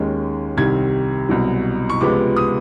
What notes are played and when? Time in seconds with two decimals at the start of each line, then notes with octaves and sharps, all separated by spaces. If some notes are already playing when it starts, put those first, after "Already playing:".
Already playing: D#2 D#3 G#3 C#4
0.57 C2 C3 D#3 G#6
1.29 C2 B2 F#3
1.90 C#6
2.01 C#2 C3 F3 G#3 B3 D6
2.37 D#6